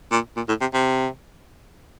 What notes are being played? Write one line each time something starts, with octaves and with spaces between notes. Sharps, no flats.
A#2
A#2
A2
C3
C3